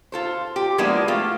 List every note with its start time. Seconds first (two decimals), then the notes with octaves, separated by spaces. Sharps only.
0.12 F4 A4 C5
0.56 G4
0.78 F3 G#3 A#3 B3 D4 E4
1.08 A3 F4 G4